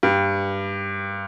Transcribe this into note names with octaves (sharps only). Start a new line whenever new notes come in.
G2